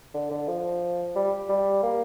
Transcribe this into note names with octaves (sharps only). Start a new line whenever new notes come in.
D3
D3
F3
G3
G3
A#3